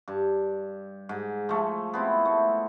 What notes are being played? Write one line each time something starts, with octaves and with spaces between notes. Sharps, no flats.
G2
G#2
F3 A3
B3 C4 E4
A3